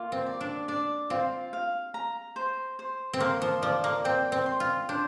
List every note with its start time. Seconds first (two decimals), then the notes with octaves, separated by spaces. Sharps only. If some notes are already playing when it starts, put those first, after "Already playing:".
Already playing: A#3 F4
0.12 C4
0.26 D5
0.41 D4
0.68 D4 D5
1.10 C4 F4
1.53 F5
1.94 A#5
2.36 C5
2.79 C5
3.13 C4
3.20 A#3 C6
3.42 F3
3.62 F3 D5
3.84 A#3
4.05 C4 G5
4.32 C4
4.46 C6
4.60 F4
4.89 D4 C5